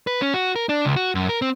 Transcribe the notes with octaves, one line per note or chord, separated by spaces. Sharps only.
B4
C#4
F#4
A#4
D4
C#2
F#4
F#2
A#4
C4